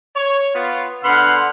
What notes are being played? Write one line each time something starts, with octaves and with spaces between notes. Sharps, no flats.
C#5
B3 F4
D3 B3 F#5 B5 C6 F6